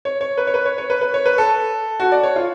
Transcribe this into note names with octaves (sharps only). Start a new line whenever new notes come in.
C#5
C#5
B4
C#5
B4
C#5
C#5
B4
B4
C#5
B4
A4
F#4
D5
C#5
F4